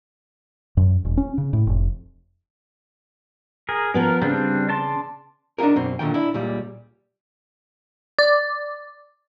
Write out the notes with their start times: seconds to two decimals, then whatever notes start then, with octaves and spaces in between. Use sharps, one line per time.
0.77 F#2
1.05 E1
1.17 C#4
1.38 C#3
1.53 A2
1.67 F1
3.69 G#4 A#4
3.94 F3 B3 C#4 A#4
4.22 C#3 G3 C4 D4
4.69 D5 A5 C6
5.58 D4 D#4 F4 G#4 A#4
5.75 F#2 B2 C4
5.99 A#2 D3 D#3 G5
6.14 D4 E4
6.34 C#2 A#2 G3
8.19 D5